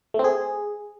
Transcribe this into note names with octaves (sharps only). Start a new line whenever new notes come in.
A3
C4
G#4